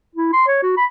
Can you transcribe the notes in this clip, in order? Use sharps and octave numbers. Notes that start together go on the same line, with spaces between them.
E4
C6
C#5
F#4
B5